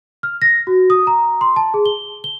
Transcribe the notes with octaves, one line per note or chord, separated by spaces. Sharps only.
F6
A#6
F#4
D#6
A#5
C6
A5
G#4
G7
G7